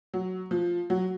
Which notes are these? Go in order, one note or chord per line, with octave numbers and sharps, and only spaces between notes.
F#3
F3
F#3